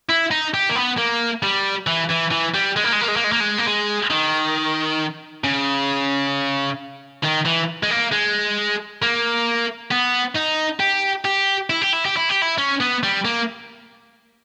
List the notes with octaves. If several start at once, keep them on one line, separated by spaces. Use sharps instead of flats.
E4
D#4
G4
A#3
B3
A#3
G3
E3
E3
E3
G3
G#3
A#3
G#3
A#3
G#3
A#3
G#3
A#3
G#3
A#3
G#3
D#3
C#3
D#3
E3
G#3
A#3
G#3
A#3
B3
D#4
G4
G4
E4
G4
E4
G4
E4
G4
E4
C#4
B3
G3
A#3